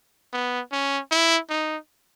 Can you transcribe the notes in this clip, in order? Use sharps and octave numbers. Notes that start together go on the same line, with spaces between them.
B3
C#4
E4
D#4